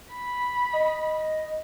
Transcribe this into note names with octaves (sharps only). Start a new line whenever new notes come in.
B5
D#5